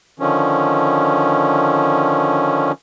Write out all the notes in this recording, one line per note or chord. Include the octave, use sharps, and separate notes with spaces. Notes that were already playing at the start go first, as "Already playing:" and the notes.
D3 D#3 F3 C#4